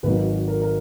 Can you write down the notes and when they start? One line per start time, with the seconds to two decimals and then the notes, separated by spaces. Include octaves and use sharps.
0.03 G#1 G#2 F#3 A#3 B4
0.48 A#4
0.62 A#4